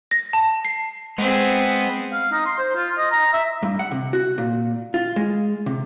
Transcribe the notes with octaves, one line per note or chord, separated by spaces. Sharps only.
A#6
A5
C7
G#3 B3 C4 G#4
F5
D#4
C6
C5
F4
D#5
A#5
E5
G2
F#5
C3
F#4
A#2
F4
G#3
C3